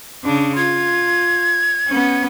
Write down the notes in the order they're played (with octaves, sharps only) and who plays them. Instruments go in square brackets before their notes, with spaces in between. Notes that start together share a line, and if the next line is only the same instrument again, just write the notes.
[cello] C#3 D4
[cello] F4 [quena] G#6
[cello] B3 C#4